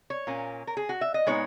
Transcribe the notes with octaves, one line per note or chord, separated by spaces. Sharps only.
C#5
A#2 A#3 C#4
A#4
G#4
F#4
E5
D#5
A#2 G#3 B3 D#4 C#5